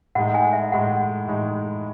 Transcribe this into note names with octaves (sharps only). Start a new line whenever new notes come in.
A2 G#3 D#4 F#5
G#5
E5
A2 G#3 D#4 F#5
A2 G#3 D#4